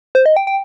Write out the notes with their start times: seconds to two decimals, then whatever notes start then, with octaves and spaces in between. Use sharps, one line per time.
0.15 C5
0.26 D#5
0.36 G5
0.47 G5